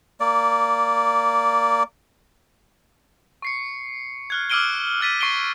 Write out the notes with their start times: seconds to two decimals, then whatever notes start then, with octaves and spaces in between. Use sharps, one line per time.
0.20 A#3 D5
3.42 C#6 C7 C#7
4.30 F6 F#6 G#6
4.50 D6 E6 F6 D7 D#7 G7
5.01 F6 A6 B6 D#7
5.21 C#6 C7 D7 D#7 G7